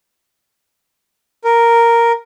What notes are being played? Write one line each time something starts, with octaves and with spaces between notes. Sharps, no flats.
A#4